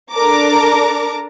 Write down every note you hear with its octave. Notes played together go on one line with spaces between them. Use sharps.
D4 A4 A#4 A5 A#5 D6